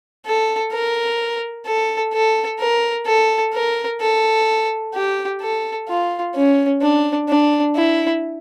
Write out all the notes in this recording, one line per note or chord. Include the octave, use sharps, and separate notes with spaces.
A4
A#4
A4
A4
A#4
A4
A#4
A4
G4
A4
F4
C#4
D4
D4
E4